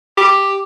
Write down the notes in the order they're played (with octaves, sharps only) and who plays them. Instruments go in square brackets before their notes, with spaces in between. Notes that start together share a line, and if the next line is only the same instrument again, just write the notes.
[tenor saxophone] G4